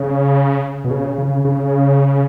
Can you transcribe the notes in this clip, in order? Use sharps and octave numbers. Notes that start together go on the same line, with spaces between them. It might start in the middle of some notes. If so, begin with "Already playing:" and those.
Already playing: C#3
B2
C#3
C#3
C#3